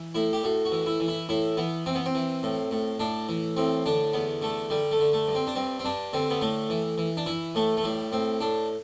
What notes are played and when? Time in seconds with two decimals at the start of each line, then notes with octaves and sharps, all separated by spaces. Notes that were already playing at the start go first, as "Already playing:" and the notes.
Already playing: E3
0.15 A2 E4
0.33 G4
0.44 A2 F#4
0.65 F#4
0.72 E3
0.86 E4
1.00 E3
1.08 E4
1.29 A2 E4
1.57 E3 B3
1.86 E3 C4
1.95 B3
2.06 C4
2.15 E3
2.43 A2
2.71 A2
3.00 A2 D4
3.29 E3
3.57 A2 C4
3.86 D3 D4
4.14 E2 B3
4.42 D3 A3
4.70 D3 G3
4.91 A3
4.99 D3
5.13 A3
5.28 G2
5.35 C4
5.47 D4
5.55 G2 C4
5.80 C4
5.85 G2 D4
6.13 D3 C4
6.30 B3
6.42 A2 A3
6.70 E3
6.98 E3
7.17 D4
7.26 E3 E4
7.55 A2 A3
7.77 A3
7.84 A2 G3
8.12 A2 C4
8.40 A2 D4